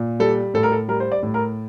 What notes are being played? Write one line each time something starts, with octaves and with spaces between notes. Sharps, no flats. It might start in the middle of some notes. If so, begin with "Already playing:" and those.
Already playing: A#2
G3 A4
A2 A4
A#4
A4
G3 A#4
C5
D5
A2
A#4